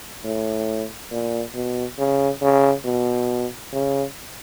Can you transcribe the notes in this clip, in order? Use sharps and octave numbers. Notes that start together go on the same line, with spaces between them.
A2
A#2
B2
C#3
C#3
B2
C#3